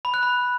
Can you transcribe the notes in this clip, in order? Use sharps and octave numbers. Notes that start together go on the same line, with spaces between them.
B5
F#6
B5